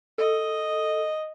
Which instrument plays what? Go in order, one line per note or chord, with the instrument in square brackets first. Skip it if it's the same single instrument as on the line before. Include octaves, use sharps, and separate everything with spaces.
[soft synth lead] A4 [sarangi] D#5